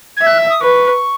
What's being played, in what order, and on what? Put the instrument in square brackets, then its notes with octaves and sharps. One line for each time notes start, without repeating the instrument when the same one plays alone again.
[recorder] G#6
[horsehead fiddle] E5 [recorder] F#6
[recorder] E6
D#6
[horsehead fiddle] B4 [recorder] C#6